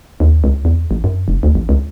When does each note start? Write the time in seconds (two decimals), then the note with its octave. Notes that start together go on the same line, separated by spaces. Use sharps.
0.20 D#2
0.44 C#2
0.65 E2
0.91 A1
1.04 F#2
1.28 F1
1.43 D2
1.55 A1
1.69 C#2